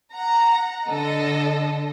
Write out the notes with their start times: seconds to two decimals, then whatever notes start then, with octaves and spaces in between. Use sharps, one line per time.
0.13 F#5 A#5
0.88 D3 A4 D#5